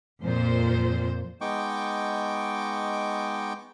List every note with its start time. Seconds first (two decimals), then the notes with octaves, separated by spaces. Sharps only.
0.20 F2 A#2 C5
1.41 G#3 B3 D#4 G5 C#6 D6